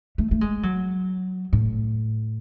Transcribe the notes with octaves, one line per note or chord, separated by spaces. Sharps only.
A3
A3
G#3
F#3
A2